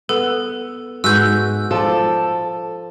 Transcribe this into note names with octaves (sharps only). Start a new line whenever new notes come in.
B3 A4
G#2 F#4 B4 E6 G6
F3 A4 D5